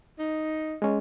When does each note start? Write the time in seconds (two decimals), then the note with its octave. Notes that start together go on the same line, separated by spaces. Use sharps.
0.19 D#4
0.82 G#3 C#4